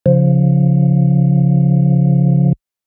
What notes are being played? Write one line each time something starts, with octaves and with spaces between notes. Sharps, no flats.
C#3 F3